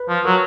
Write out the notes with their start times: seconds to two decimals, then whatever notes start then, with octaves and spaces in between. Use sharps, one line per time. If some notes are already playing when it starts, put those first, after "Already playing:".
Already playing: B4
0.09 F3
0.25 F#3 A#4